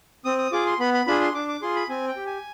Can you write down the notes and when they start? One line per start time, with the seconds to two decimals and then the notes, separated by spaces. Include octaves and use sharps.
0.25 C4 D#6
0.38 D#6
0.52 F4 G#4 D6
0.66 C6
0.79 B3 B5
0.94 B5
1.07 D4 F4 G#4 B5
1.21 C6
1.34 D4 D6
1.48 D6
1.62 F4 G#4 C6
1.75 B5
1.89 C4 G#5
2.08 G5
2.16 G4
2.26 G#5